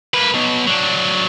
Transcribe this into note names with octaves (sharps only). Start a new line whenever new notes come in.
A#3 B4
B2 F#3
F#3 D4